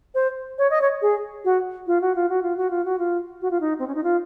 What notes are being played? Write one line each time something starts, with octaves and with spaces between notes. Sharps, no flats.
C5
C#5
D#5
C#5
G#4
F#4
F4
F#4
F4
F#4
F4
F#4
F4
F#4
F4
F#4
F4
D#4
C4
C#4
D#4
F4